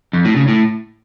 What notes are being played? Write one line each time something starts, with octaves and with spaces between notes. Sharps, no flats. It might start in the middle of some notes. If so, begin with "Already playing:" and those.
F2
A2
C#3
A2